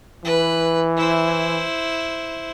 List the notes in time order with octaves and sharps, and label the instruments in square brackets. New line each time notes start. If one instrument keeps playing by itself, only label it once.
[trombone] E3 [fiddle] B4
[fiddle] E4 C5